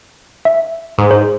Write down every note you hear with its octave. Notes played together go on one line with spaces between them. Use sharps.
E5
G#2
C5